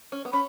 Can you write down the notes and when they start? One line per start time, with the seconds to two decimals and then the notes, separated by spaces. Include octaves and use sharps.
0.12 C#4
0.25 B3
0.33 C#4 B5